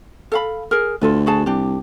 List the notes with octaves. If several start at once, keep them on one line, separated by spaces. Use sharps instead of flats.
A4 F5 B5
G#4 A#4
D2 F4 A4 B4
F#4 G#4 A5
C2 D4 G4